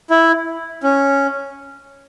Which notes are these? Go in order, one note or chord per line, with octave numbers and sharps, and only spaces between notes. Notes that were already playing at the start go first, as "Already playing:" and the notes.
E4
C#4